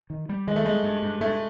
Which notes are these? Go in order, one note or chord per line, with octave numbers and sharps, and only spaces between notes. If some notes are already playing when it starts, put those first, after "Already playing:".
D#3
G3
D#3 G#3
A3
G3 G#3
G2
G2
G2 A3